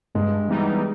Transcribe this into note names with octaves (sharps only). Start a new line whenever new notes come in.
G2 G#3
E3 G3 B3 D#4